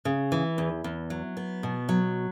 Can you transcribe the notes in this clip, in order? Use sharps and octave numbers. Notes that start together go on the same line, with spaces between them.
C#3
E3
E2
E2
F#3
B3
B2
F#3